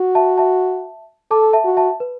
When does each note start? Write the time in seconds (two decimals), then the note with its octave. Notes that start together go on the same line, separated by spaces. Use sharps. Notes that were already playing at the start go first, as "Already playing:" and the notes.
Already playing: F#4
0.15 E5 A5
0.38 E5 A5
1.31 A4 A5 D6
1.53 E5 A5
1.65 F#4
1.77 E5 A5
2.00 B4